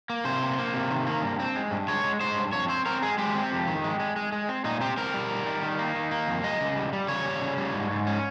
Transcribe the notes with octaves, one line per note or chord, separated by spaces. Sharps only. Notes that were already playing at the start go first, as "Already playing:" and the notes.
A#3
C3 C5
A#3
A#3
C3
D#3
A#3
G2
C4
G#3
G2
G#3 C#5
G#3
G#3 C5
G2
F2 C#5
C4 C5
C4 A#4
G#3 G#4
G#3 G4
C4
F2
D#3
G#3
G#3
G#3
G#3
C4
A#2 D#4
C4 G4
C4 A#4
G3
D#3
G3
D#3
A#3
D#3
A#3
F2
G3 D#5
C#3
G3
G3
C#3 C#5
G3
C#3
G3
G#2
G#2
C#4